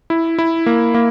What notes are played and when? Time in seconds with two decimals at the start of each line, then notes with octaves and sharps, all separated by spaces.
0.10 E4
0.38 E4
0.66 A#3
0.94 A#3